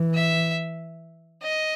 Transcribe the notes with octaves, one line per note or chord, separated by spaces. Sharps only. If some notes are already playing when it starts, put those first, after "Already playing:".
Already playing: E3
E5
D#5